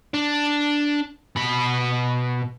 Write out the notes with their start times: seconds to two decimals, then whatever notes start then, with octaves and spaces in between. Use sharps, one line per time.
0.14 D4
1.37 B2 B5